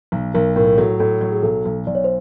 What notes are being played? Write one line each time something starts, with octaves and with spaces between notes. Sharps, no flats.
B1
B1 A#4
A2 A#4
A#4
F#3 A4
A2 A4
F#3
G#4
B1 A4
B1
B1 D5
C#5
C5